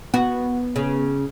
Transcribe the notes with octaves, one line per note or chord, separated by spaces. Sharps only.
B3 F#4
C#3